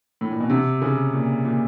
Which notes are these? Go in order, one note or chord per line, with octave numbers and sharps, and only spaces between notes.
A2
A#2
B2
C3
C#3
A#2
A#2